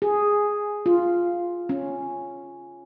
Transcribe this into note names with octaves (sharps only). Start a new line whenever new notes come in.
G#4
F4
C#4